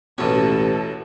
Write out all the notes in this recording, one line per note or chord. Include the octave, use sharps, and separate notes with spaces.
A1 D#2 B2 E3 C#4 A4